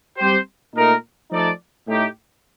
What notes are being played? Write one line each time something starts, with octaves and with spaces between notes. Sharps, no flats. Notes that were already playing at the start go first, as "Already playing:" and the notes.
G3 C4 G4 C5
A#2 A3 D#4 A#4
F3 A3 D#4 A4 D5
A2 A3 D#4 G4